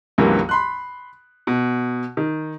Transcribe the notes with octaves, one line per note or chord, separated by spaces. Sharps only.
C#2 G2 E3 F#3 A#3
B5 C6 F#6
B2
D#3